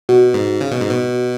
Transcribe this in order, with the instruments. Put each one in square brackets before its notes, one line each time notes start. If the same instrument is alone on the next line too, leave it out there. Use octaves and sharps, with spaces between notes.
[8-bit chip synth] B2 [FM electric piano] F#4
[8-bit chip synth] G#2
C#3
B2
G#2
B2